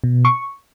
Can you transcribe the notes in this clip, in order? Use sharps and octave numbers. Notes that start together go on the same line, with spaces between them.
B2
C#6